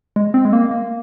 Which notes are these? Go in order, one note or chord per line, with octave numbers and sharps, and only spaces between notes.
G#3
C4
G#3
A#3
A#3